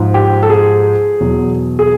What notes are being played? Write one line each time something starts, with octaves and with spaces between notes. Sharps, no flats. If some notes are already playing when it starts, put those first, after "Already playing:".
Already playing: G#2 F3
G4
A4
G#4
E2 B2 F#3
G#4